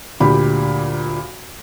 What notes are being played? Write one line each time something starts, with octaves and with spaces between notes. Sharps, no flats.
D2 A#2 G4 B5